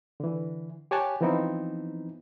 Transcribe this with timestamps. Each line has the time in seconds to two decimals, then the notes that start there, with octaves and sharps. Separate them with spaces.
0.20 D3 E3
0.91 G4 C#5 G#5 A5 F#6
1.21 E3 F3 B3 C4 D#4 E4